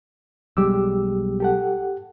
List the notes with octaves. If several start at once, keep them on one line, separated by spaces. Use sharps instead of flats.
B1 G3 G#3 G4 D6 E6
G4 A4 F#5